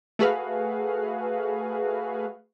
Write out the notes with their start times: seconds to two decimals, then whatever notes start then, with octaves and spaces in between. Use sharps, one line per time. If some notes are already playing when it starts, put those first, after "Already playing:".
0.19 A3 F#4 G#4 B4 F5